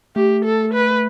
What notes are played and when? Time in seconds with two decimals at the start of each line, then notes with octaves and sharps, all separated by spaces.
0.16 A3 G4
0.45 A4
0.74 B4